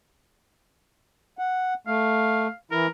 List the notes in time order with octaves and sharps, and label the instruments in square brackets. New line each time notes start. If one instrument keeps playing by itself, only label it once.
[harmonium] F#5
[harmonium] A3 [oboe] F5
[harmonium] E3 E4 [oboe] A#4